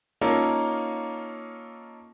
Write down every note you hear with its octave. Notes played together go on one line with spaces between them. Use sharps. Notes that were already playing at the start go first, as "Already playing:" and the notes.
A#3 C#4 D#4 F4 A4 A#4